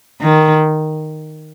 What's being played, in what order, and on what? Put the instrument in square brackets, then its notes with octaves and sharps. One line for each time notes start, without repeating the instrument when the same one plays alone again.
[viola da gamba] D#3